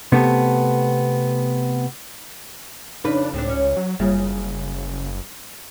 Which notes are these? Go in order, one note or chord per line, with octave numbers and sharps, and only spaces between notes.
C3 A3 B3
F2 C#3 D4 D#4 B4
C#2 A2 C4 D4
C#4
F#3
F#1 C#3 G3 A#3 F4